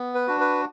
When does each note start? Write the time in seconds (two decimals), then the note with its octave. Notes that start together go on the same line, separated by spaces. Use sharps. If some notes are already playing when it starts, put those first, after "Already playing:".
Already playing: B3
0.15 B4
0.27 D4 F#4
0.41 B4